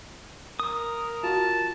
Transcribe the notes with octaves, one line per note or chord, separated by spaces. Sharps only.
A#4 D#6
F4 F#4 A5